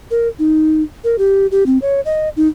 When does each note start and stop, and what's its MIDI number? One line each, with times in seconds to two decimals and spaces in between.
0.11 0.28 70
0.39 0.83 63
1.04 1.16 70
1.18 1.47 67
1.51 1.66 67
1.66 1.78 60
1.82 2.01 73
2.05 2.29 75
2.37 2.48 63